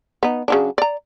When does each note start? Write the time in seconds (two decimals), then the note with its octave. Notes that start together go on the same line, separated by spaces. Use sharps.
0.23 B3 D#4
0.48 C#3 F#3 D4
0.78 D5 A#5